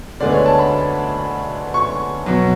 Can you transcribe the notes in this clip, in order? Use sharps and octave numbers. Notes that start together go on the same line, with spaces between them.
D2 D3 G#3 B3 D5
C#5
A5
B5
C#6
B2 F#3